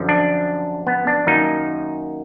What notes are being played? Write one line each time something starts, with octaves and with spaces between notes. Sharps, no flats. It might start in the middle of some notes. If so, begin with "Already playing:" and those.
Already playing: F#2 D3 F3
D4
B3
D4
F#2 D#3 A#3 D#4